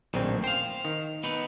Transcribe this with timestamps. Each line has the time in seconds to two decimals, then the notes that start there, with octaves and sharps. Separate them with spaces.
0.14 A#1 F#2 A2 D#3 C4
0.44 C5 F5 G5
0.85 D#3
1.24 B3 D#4 B4